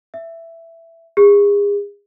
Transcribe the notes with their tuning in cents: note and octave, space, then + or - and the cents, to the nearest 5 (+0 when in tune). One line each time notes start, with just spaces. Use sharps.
E5 +10
G#4 -35